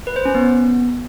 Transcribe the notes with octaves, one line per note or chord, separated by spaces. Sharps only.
B4
C5
C#4
B3